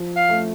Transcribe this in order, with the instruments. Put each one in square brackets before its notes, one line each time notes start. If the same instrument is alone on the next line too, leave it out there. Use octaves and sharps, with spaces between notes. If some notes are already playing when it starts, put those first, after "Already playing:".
Already playing: [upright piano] F3
[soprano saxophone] F5
[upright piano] A3